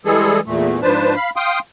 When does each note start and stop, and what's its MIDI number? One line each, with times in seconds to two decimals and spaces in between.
0.05 0.40 52
0.05 0.40 55
0.05 0.40 56
0.05 0.40 68
0.05 0.40 69
0.46 0.81 40
0.46 0.81 46
0.46 0.81 57
0.82 1.15 44
0.82 1.15 53
0.82 1.15 62
0.82 1.15 71
0.82 1.15 72
0.82 1.15 81
1.16 1.30 77
1.16 1.30 83
1.36 1.59 77
1.36 1.59 79
1.36 1.59 84
1.36 1.59 87